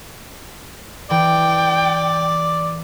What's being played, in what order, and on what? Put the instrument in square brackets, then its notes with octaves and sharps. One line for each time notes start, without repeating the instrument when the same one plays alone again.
[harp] E3 [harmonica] D5 [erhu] G5